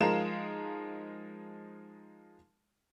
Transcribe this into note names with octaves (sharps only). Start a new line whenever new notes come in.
F3 G#3 D#4 A#4 F5 E7